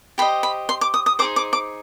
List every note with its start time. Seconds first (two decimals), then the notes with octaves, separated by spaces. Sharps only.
0.18 G4 C5 D#5 B5
0.43 B5
0.69 C6
0.81 D6
0.94 D#6
1.06 D#6
1.19 D#4 G#4 C5 D6
1.36 D6
1.53 D6